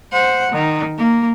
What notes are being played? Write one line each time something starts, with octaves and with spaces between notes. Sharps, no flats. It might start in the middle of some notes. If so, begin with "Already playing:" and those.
C5 F#5
D#3
A#3